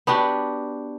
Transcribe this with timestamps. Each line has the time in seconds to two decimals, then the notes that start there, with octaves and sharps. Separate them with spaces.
0.07 B3 D4 F#4 G4